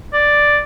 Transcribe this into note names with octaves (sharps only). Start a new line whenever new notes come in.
D5